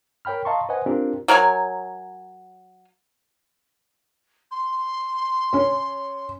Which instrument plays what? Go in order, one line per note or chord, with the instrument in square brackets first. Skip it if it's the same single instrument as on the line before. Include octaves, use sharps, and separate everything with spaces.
[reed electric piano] A#4 C#5 G5 B5 F6
D#5 F5 A5 A#5 C6 C#6
B4 C5 D#5 F#5 G#5
C4 D4 F4 G4 A#4
[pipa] F#3 A#4 C#5 G#5
[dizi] C6
[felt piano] C#4 C#5